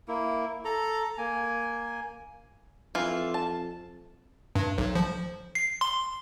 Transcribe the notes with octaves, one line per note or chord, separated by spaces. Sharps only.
A#3 E4
A4 A#5
A#3 G#5
F2 E3 F4
A5
G2
B1
F3
C7
C6